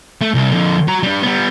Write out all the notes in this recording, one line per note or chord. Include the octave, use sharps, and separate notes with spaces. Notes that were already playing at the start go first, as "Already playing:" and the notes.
A3
C2
F2 D3
F#4 A#5
G3 D4
G3 B3